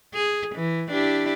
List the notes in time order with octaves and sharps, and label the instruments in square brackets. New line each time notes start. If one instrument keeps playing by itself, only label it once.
[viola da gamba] G#4
E3
D4 E4 G4